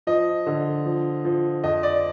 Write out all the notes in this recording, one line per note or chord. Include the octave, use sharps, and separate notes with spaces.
F3 D#5
D3
F3
F3
F2 D#5
D5